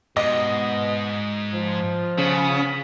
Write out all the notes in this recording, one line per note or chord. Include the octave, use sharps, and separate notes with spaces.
G#2 B2 D#5
F3
C#3 B3